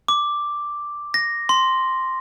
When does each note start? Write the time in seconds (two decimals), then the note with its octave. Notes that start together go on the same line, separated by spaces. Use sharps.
0.08 D6
1.14 A#6
1.49 C6